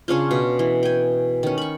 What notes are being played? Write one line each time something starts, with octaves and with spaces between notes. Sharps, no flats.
C#3 C#4 D4 F4
B2
E3
G5 G#5
D#3 C#4
B5 C#6